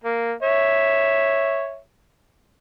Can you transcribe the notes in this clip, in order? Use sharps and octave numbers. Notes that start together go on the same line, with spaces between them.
A#3
C#5 E5